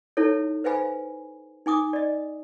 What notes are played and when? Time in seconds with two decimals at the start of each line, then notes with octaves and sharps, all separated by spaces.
0.17 D#4 E4 A4 C#5
0.64 B4 C5 E5 F5 G#5 B5
1.66 D#4 G#5 D6 D#6
1.93 D5 D#5